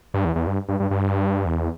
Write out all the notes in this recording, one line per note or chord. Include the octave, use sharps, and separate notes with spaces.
G2
E2
E2
G2
G2
G2
G2
E2